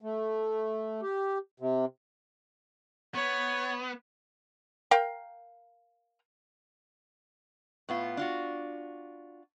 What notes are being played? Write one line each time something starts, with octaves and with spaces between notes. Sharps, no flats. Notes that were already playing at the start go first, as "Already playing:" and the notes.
A3
G4
C3
B3 C#5
A#4 F5 G5
A2 B3 F4
D4 F4 F#4